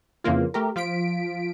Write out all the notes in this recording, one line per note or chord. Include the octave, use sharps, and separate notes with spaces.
F2 C#3 E3 A#3 F4
A3 G4 A#4
F3 F4 B6 D7